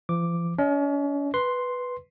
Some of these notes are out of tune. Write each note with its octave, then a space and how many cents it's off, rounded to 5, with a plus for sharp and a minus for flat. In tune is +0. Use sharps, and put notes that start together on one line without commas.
F3 -45 D6 +0
C#4 +40 D#5 +20
B4 +0 C6 +0